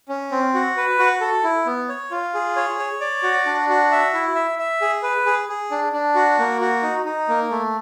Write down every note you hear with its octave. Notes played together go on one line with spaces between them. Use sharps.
C#4
C4
F#4
B4
F#4
A4
E4
B3
C#5
F4
G#4
C#5
C#5
D5
F#4
D4
F#4
E5
E4
E5
E5
G#4
B4
G#4
G#4
D4
D4
F#4
A#3
F#4
D#4
D#4
A#3
A3